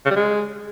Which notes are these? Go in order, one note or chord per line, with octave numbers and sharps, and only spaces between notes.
C#3
G3
G#3